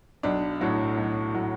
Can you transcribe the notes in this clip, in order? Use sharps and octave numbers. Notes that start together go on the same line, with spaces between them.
B1 D4
A2 F#3 F#4
B1
A2 F#3